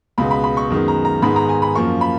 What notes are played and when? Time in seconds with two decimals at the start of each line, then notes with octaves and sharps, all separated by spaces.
0.18 C#2 B2 G#3 B3 B5
0.31 B5
0.44 B5
0.57 C#6
0.70 F#2 D#3 G#3 B3
0.88 A#5
1.05 A#5
1.22 G#2 D#3 G#3 B3 B5
1.36 A#5
1.49 G#5
1.62 B5
1.75 F#2 F3 A#3 C#6
2.01 B5